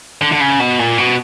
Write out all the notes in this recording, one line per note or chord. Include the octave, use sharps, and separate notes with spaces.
D3
D3
C#3
B2
A#2
B2